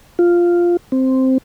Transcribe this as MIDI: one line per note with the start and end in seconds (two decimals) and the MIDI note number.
0.19 0.77 65
0.92 1.38 60